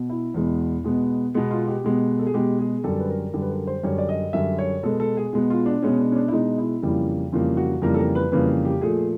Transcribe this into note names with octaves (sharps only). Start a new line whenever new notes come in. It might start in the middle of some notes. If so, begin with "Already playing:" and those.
Already playing: B2 B3
E4
E2 B2 G#3 B3
B2 G#3 B3
B2 G#3 B3
F4
G4
B2 G#3 B3
A4
G#4
B2 G#3 B3 G4
G#4
F#2 D3 G3 A4
B4
A#4
F#2 D3 G3
B4
A#4
C5
F#2 D3 G3 C#5
D5
D#5
F#2 D3 G3 E5
C#5
B2 G#3 B3 A4
A4
G#4
B2 G#3 B3
F4
D4
B2 G#3 B3 C#4
D4
C#4
D4
E4
B2 G#3 B3 D#4
E4
F2 C#3 E3 G3 A#3 E4
F2 C#3 E3 G3 A#3 F4
F#4
F2 C#3 E3 G3 A#3 A#4
A4
A#4
B4
F2 C#3 E3 G3 A#3 B4
G4
A#2 F3 A3 G#4